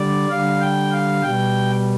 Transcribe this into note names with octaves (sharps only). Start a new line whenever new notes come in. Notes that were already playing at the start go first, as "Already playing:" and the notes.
Already playing: D3 G3 D5
D3 G3 F5
G5
F5
B2 G3 G5